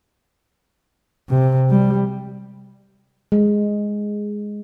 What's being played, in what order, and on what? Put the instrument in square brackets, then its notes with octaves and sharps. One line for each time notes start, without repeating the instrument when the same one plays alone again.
[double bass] C3
G3
[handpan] G#3